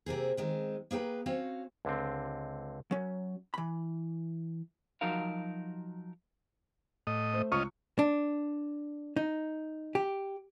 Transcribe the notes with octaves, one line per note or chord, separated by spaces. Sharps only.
C3 A#3 C4 G#4
D#3 G#3 C4
A#3 G#4 B4 G5 A#5
C4 C#4 F#4 C#5 F5
C#2 D3 C4
F#3 C#4
E3 B5
F3 F#3 D#4 F#4 A#4 F5
A2 D#5
A3 C5
C#2 C#4 F4 D#5 C#6
D4
D#4
G4